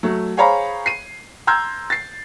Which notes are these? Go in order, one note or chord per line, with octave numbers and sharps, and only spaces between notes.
F#3 A3
G#4 C5 C#5 F5 A#5 B5
C7 D#7
A#5 C6 E6 F6 G6 G#6
A6 C7